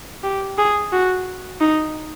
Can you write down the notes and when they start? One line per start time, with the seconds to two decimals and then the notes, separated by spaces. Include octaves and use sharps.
0.23 G4
0.58 G#4
0.92 F#4
1.61 D#4